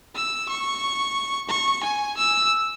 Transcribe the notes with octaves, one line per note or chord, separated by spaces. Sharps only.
E6
C#6
C#6
G#5
E6